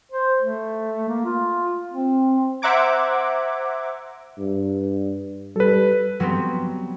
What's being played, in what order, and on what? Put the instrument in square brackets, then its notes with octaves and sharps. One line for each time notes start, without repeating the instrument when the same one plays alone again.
[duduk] C5
A3
A#3
F4
C4
[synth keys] C5 E5 F#5 A#5 D6 G#6
[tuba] G2
[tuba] G3 [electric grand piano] A4 B4
[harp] F#3 G3 B3 C4